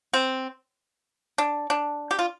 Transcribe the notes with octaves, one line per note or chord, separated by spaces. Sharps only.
C4
D4
D4
G4
F4